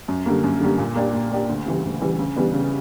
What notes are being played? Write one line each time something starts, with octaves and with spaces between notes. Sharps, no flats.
F#2
D3 G3 A#3
F#2
D3 G3 A#3
A#2
A#3 D4 G4
A#2
A#3 D4 G4
D2
C#3 E3 G3
D2
C#3 E3 G3
C#3
E3 G3 B3 D4
C#3